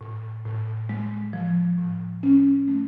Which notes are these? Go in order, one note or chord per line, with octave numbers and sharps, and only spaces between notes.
A2
A2
G#3
F3
A2
C#4
A3